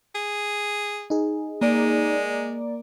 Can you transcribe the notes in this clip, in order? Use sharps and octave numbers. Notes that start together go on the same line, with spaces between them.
G#4
D#4 G#4
G#3 A#3 D5